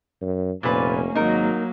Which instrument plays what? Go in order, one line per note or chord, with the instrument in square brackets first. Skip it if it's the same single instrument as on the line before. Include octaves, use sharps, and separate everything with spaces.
[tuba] F#2
[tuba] F1 [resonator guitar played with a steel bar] A#2 B4 [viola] A#3 C#4
[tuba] G#1 [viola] F#3 A#3 [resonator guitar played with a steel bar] D#4 A#4